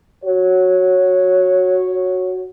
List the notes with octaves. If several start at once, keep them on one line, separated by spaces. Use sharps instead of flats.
F#4 C#5